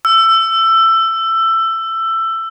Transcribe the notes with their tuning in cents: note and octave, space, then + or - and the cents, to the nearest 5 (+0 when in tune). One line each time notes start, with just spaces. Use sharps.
E6 +15